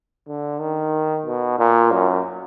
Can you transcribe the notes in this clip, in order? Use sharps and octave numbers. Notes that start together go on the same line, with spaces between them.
D3
D#3
B2
A#2
F#2